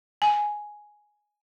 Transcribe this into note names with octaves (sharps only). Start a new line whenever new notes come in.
G#5